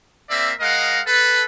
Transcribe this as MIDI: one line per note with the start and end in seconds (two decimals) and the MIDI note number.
0.30 0.52 58
0.30 0.52 60
0.30 0.52 74
0.30 0.52 76
0.61 1.01 56
0.61 1.01 70
0.61 1.01 75
0.61 1.01 77
0.61 1.01 78
1.07 1.43 69
1.07 1.43 71